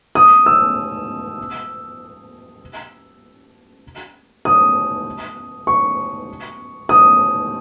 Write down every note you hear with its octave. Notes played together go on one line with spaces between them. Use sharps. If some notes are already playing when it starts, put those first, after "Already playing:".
D#6
E6
D#6
C#6
D#6